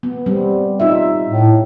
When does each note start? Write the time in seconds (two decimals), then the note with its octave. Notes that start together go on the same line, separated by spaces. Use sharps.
0.03 B3
0.26 G3 C4
0.80 D#4 F4 E5
1.29 A2